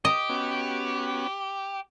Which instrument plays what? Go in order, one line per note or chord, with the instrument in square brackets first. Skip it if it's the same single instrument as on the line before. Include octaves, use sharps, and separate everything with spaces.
[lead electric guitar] G4 [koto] D#5
[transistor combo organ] B3 C#4 F#4